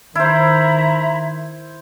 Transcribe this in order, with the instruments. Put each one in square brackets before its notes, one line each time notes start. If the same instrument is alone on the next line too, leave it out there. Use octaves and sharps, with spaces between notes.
[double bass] D#3 [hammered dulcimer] E4 C5 [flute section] E5 A#5 B5